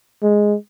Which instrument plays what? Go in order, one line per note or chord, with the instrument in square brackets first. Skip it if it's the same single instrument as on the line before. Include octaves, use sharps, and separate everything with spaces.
[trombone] G#3